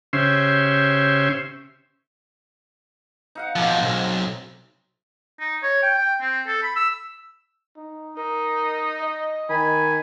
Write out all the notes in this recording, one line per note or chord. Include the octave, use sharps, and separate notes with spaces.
C#3 C#4 G4 C5 E5 C6
D#4 F5 F#5
B2 F3 G#3 A#3 E5
B1 C4
D#4
C#5
G5
G5
C4
A4
B5
E6
D#4
D#4 A#4
D#5
D#3 G#5 B5